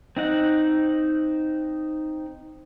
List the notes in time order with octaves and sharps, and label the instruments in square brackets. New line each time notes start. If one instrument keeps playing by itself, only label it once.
[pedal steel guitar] C4 D#4 F#5